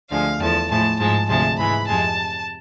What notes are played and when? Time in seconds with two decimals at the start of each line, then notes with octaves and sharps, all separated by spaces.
0.11 D2 D3 F3 G#3 F5
0.40 E2 D3 F3 A5
0.70 A2 F3 G#3 A5
0.99 G#2 F3 G#3 A5
1.29 D2 C3 F3 G#3 A5
1.58 G#2 E3 G#3 B5
1.87 F2 C3 G#3 A5